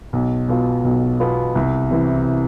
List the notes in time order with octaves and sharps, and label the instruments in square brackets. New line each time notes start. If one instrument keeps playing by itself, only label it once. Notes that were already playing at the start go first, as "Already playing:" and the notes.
[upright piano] B1
B2 B3 F4
B1
B2 B3 F4
C2
C3 E3